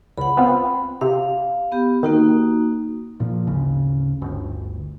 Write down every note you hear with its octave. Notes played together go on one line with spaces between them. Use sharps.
C#2 F#5 B5
B3 C4 F4
C3 F5
B3 G4
D#3 A#3 D#4 F#4
A#2 F3
G#1 D2 C#3
G1 D2